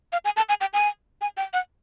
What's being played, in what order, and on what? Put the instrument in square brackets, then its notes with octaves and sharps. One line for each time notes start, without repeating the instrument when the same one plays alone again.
[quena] F5
G#5
A5
G#5
G5
G#5
G#5
G5
F#5